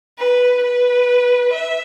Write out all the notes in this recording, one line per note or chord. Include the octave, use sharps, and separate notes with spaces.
B4
B4
E5